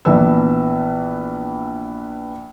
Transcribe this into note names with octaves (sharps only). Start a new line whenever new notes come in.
A#1 E3 B3 E6